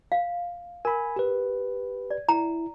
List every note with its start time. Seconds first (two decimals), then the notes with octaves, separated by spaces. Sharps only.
0.12 F5
0.85 A#4 G#5 B5
1.16 G4 B4
2.11 D5
2.29 E4 A#5